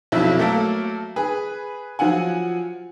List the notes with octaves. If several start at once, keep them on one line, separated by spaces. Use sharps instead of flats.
B1 F2 F#3 E4 E5
F#3 A3 A#3 A4 A#4 F5
G#4 B4
F3 F#3 F4 F#5 G#5